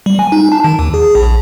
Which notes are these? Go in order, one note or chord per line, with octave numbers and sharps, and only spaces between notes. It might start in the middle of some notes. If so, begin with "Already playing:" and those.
G3
G#5
D#4
A5
D#3
D#2
G#4
A#1